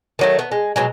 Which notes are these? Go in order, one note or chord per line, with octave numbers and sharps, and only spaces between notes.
D#3 F#3 A3
B3
G#3
B2 F#3 G#3